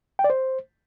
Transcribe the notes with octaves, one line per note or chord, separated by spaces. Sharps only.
G5
D5
C5